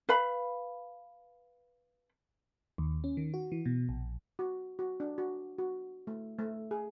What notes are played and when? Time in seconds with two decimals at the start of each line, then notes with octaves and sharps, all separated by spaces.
0.09 B4 F5 B5
2.78 D#2
3.04 C#4
3.17 D#3
3.34 F#4
3.52 E3
3.66 B2
3.89 A#1
4.39 F#4
4.79 F#4
5.00 D4
5.18 F#4
5.59 F#4
6.07 A3
6.39 A3
6.71 G#4